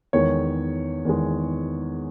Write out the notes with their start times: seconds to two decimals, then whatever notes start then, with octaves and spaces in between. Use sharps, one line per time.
0.13 E2 D#3 G#3 C#5
1.05 E2 D#3 G#3